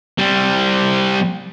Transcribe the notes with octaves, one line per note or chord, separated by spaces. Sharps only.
G3 C4